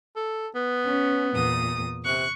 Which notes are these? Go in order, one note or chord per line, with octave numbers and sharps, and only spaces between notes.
A4
B3
C#4
E2 A#2 D#6
C3 C#6 F#6